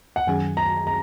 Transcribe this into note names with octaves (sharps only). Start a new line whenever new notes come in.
F#5
F#2 D#3 F#3 C#4 G#4 G#5
A#5
A#5